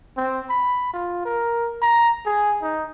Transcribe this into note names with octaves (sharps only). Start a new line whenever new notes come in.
C4
B5
F4
A#4
A#5
G#4
D#4